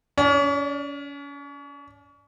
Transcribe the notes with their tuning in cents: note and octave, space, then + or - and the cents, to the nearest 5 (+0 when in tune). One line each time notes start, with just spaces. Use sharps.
C#4 +35 D5 +0